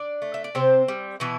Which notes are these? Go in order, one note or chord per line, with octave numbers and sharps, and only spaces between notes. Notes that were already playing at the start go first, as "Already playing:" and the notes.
Already playing: D4 D5
A3
E5
D5
C3 C4 C5
G3
B2 E3 E4